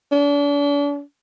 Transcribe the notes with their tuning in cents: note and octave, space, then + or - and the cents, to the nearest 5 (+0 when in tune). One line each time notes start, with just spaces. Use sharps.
D4 -40